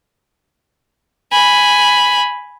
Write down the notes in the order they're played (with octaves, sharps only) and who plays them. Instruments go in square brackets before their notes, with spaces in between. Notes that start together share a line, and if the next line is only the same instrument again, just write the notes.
[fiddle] G#5 B5